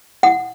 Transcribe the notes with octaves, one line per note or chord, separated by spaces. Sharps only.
F#5